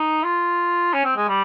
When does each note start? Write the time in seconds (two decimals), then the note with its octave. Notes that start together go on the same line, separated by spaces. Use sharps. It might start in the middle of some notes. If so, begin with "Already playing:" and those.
Already playing: D#4
0.24 F4
0.94 C#4
1.05 C4
1.17 G#3
1.28 G3